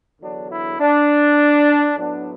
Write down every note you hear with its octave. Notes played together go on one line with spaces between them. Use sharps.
E2 D3 F#3 B3 D4
E4
D4
A2 F#3 B3 D4